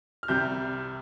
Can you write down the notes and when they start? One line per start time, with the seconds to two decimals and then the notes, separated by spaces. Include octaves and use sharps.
0.23 F6
0.28 C2 C3 G3 G6